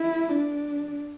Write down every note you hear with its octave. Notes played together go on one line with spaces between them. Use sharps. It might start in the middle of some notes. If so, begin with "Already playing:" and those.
Already playing: E4
D4